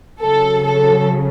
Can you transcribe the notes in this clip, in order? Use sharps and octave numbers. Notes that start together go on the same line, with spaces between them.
C#3 F#3 A4
A4